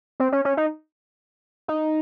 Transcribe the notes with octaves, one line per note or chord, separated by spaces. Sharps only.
C4
C#4
C#4
D#4
D#4